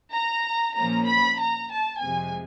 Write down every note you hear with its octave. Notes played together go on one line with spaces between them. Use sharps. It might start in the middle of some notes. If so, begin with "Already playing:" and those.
A#5
A#2 F3 A#3 C#4 A#5
B5
A#5
A5
F2 C3 F3 G#3 G#5